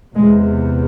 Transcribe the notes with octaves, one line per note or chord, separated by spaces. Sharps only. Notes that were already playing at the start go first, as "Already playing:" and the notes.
E2 C3 G#3